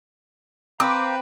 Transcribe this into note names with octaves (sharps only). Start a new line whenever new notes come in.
C4 B4 F5 A#5 D6 G6